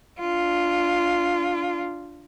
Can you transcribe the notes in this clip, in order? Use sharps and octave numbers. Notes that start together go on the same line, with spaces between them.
D4 F4